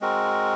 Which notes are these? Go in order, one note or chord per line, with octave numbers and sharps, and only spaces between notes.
G#3 C4 F#4 A#4